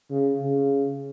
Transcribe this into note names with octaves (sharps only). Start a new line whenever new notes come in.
C#3
C#3